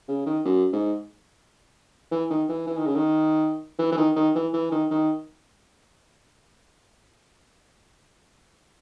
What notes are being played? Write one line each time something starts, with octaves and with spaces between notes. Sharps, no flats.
C#3
D#3
F#2
G#2
E3
D#3
E3
E3
D#3
C#3
D#3
E3
E3
D#3
D#3
E3
E3
D#3
D#3